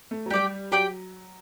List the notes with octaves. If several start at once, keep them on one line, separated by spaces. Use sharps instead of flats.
A3
F#3
G3 G4 D5 G5
F#3 G4 D5 G5